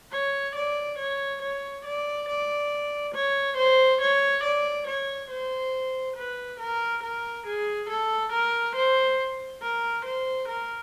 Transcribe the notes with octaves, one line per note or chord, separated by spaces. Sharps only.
C#5
D5
C#5
C#5
D5
D5
C#5
C5
C#5
D5
C#5
C5
B4
A#4
A#4
G#4
A4
A#4
C5
A#4
C5
A#4